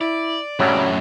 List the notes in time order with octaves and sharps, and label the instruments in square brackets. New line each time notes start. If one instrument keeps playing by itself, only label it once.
[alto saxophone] E4 [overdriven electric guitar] D5
[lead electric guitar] F#2 A2 [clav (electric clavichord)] C#3 F#3 G3 [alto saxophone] C#5